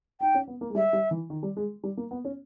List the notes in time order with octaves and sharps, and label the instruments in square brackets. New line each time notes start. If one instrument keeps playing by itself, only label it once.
[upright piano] D#4 [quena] G5
[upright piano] C#4
B3
A#3
G#3
[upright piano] G3 [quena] E5
[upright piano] G3
E3
D#3
G3
G#3
G3
A#3
B3
C#4